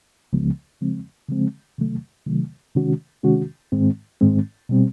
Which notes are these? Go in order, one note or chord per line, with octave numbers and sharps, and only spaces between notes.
C#2 C#3 F3 G#3 B3
C#3 F3 G#3 C4
C#3 F3 G#3 C4
C3 D#3 F#3 A3
C3 D#3 F#3 A3
C3 D#3 G#3 C#4 F#4
C3 D#3 G#3 C#4 F#4
G#2 D#3 G#3 C4
G#2 D#3 G#3 C4
B2 G3 C4